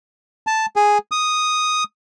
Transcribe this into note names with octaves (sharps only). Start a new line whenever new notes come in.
A5
G#4
D#6